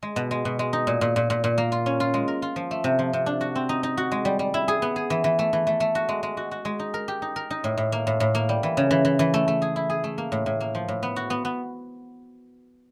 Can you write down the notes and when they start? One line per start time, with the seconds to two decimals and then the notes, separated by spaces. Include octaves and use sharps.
0.03 G#3
0.16 B2
0.31 G#3
0.45 B2
0.59 G#3
0.73 D#4
0.87 A#2
1.01 A#2
1.16 A#2
1.30 A#2
1.44 A#2
1.58 A#3
1.72 F4
1.86 C#4
2.00 F4
2.14 G#3
2.28 A#4
2.42 F4
2.56 F3
2.71 A3
2.84 C3
2.99 F3
3.13 C3
3.26 D4
3.41 F#4
3.55 C4
3.69 D#4
3.83 D#4
3.97 F#4
4.12 G#3
4.25 G3
4.39 G3
4.54 E4
4.68 G#4
4.82 B3
4.96 G#4
5.10 E3
5.24 E3
5.39 A3
5.53 E3
5.67 A3
5.80 A3
5.95 F#4
6.09 G#3
6.23 G#3
6.37 F#4
6.51 F#4
6.65 G#3
6.79 D#4
6.94 A#4
7.08 G4
7.22 D#4
7.36 A#4
7.50 D#4
7.64 A2
7.77 A2
7.92 A#3
8.07 A2
8.20 A2
8.35 A#3
8.49 G3
8.63 E3
8.77 C#3
8.91 E3
9.05 E3
9.19 E3
9.34 A3
9.48 A3
9.62 G#4
9.76 E4
9.90 G#4
10.04 A3
10.18 A#3
10.32 A2
10.46 A2
10.60 A#3
10.75 F3
10.88 A2
11.03 B3
11.16 F#4
11.30 B3
11.45 B3